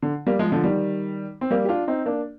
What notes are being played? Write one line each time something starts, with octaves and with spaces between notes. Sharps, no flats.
D3
G3 A#3
F3 G#3
D3 F3
D#3 G3
C4
G3 A#3
G4
D4 F4
C4 D#4
A#3 D4